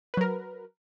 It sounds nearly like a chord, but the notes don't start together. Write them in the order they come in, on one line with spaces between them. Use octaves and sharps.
B4 F#3 A#4